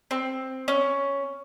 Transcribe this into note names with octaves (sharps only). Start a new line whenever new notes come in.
C4
C#4